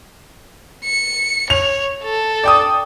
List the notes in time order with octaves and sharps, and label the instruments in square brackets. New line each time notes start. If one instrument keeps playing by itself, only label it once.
[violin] C#7
[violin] C#5 [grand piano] F7
[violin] A4
[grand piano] D5 G5 D#6